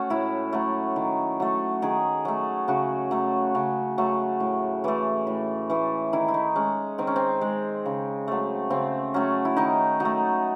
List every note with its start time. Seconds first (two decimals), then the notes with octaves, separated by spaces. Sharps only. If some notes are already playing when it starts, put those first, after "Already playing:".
Already playing: A3 C#4 F#4
0.10 A2 E4
0.53 F#3 A3
0.96 D#3
1.40 F#3 A3
1.82 D#3 G#4
2.25 F#3 A3
2.68 C#3 F#4
3.11 F#3 A3
3.55 C#3
3.98 F#3 A3
4.40 A2
4.84 E3 A3
5.27 A2
5.70 E3 A3
6.13 D#3 E4
6.28 E4
6.34 D#4
6.55 G#3 C#4
6.98 D#3 C4
7.07 C#4
7.16 C4
7.41 G#3
7.86 C#3
8.28 F#3 A3
8.70 C#3 C4
9.14 F#3 A3 C#4
9.45 E4
9.57 D#3 D#4
10.00 F#3 D#4
10.05 A3